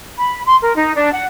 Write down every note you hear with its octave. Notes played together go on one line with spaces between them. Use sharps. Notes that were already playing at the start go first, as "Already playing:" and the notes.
B5
C6
A#4
D#4
D4
F#5